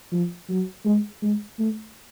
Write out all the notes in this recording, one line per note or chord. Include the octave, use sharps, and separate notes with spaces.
F3
F#3
G#3
G#3
A3